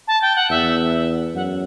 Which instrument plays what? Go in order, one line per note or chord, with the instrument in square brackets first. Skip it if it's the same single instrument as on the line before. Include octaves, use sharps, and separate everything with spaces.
[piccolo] A5
G5
F#5
[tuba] E2 [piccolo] E5
[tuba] F#2 [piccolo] F#5